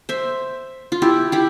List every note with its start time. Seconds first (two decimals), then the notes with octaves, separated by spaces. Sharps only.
0.09 C5 E5
0.92 F4
1.02 E4 G4
1.32 E4 G4